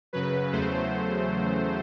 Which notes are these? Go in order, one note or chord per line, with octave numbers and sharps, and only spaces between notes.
F#2 C#3 F#3 B4
E2 C#3 F#3 A3 C5